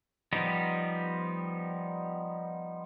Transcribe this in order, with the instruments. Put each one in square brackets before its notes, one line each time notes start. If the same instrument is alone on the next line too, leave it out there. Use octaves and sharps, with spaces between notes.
[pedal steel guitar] F3 G3 B3 D#4 G4